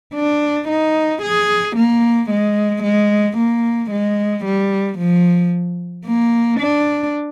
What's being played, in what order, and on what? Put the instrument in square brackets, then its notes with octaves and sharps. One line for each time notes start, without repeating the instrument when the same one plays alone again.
[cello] D4
D#4
G#4
A#3
G#3
G#3
A#3
G#3
G3
F3
A#3
D4